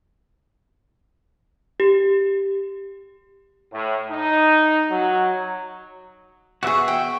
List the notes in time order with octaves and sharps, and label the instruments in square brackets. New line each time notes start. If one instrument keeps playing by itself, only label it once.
[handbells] G4
[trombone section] A2
D#4
F#3
[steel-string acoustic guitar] E2 G#4 [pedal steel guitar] F#4 E5 C#6
[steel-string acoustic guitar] G5